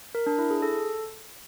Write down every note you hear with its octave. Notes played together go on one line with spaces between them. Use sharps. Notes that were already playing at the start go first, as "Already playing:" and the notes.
A#4
D4
E4
G#4
A4